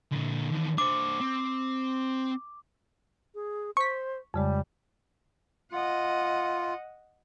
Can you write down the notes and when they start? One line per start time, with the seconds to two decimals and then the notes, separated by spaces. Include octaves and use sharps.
0.12 A#2 D3
0.51 E2 D#3
0.78 D4 C5 D6
1.21 C4
3.35 G#4
3.77 C5 C#6 B6
4.34 F2 C#3 G3 G#3
5.72 F4 D#5 F#5